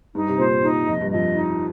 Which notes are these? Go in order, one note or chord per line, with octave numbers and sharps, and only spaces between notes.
G2 D#4
C3
A#2 C5
A#2 D#4
F2 D#5
G2
F2 D#5
D#4